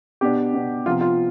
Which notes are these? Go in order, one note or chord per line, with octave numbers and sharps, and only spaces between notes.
B2 B3 D4 G4
B2 B3 D4
C3 F3 B3 F4
F4